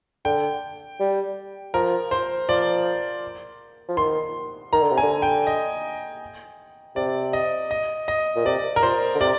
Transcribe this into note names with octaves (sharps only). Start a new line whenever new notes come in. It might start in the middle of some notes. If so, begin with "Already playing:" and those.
D3 G5
G3
F3 A#4
C5
F3 D5
F3
D#3 C6
D#3 A#5
D3
C3
G#5
D3
G5
D#5
C3 D5
D#5
D#5
D#5
A#2
C3 D5
A#4
A#2 C5
D3
C3 D5